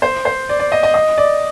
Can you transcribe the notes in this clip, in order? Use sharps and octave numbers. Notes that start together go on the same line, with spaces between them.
C5
C5
D5
D5
D#5
D#5
D#5
D5